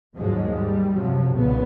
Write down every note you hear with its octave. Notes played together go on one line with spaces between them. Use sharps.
D#2 G#2 F3 F#3 G#3
G3
F#2 C3 F3 F#3
B1 A#2 C#3 B3